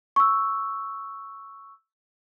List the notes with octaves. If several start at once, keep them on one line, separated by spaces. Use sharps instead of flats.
C#6 E6